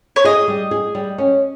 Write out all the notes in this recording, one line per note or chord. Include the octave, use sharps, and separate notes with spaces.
C#5
G#4 D#5
G3
G#4
G3
C#4